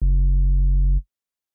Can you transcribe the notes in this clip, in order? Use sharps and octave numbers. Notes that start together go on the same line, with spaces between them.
F#1